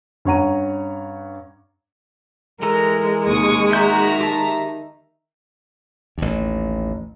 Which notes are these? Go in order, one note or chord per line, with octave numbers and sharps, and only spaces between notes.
G2 C#4 C#5 F#5 A#5 D#7
E3 G#3 A4 A#4 A#5
D#2 C3 C#6 D#6
D#3 F#4 E5 A#5 G6
G4 A5
A1 D#2